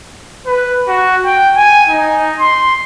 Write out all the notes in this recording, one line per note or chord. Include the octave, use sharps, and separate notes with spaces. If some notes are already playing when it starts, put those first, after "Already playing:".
B4
F#4
G5
G#5
D#4
C6